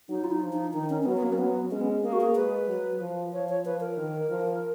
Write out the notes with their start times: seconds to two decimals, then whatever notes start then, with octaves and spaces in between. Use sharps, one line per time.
0.09 F#3 D#4
0.24 F4
0.31 D#4
0.42 F3
0.53 D#4
0.73 D#3 D#4
0.90 C#4
1.02 C#4
1.06 F#3 B3
1.17 B3
1.23 A#3
1.33 C#4
1.38 F#3 B3
1.71 G#3 C#4
1.81 B3
1.91 C#4
2.03 A#3 G#4
2.13 F#4
2.21 G#4
2.35 G#3 B4
2.68 F#3
3.00 F3
3.33 F3 C#5
3.49 C#5
3.65 F3 B4
3.81 A#4
3.97 D#3
4.29 F3